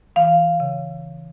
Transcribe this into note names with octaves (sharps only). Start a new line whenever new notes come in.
E3 F5
C#3